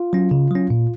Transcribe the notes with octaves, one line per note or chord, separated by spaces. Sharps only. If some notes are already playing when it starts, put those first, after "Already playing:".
Already playing: F4
F#3 C#4
C#3
F#3 C#4
A#2